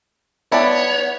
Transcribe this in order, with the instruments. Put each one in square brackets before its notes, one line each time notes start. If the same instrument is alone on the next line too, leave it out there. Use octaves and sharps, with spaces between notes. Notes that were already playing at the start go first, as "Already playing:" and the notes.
[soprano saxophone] B3 [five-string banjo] E4 D5 A5 [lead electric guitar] C#5